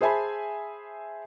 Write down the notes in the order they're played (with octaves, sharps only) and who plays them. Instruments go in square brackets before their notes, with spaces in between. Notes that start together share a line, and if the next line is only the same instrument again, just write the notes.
[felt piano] G#4 C5 E5 G#5 A5 B5